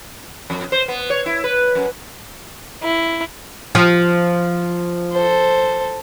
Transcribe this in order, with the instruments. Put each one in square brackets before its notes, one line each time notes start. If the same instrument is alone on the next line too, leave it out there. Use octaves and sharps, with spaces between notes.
[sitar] F2
C5
B3
C#5
E4
B4
F#2
[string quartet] E4
[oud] F3
[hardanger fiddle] A4 C5